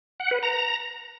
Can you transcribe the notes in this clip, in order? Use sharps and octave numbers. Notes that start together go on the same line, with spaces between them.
F#5
B4
A#5